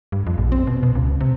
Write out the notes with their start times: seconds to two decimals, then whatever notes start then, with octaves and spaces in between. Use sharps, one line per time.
0.12 G2
0.27 F2
0.38 A#1
0.52 C4
0.67 B2
0.83 B2
0.95 C#2
1.20 C3